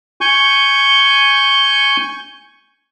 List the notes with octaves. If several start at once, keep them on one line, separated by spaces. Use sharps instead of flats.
G#5 C#6 G6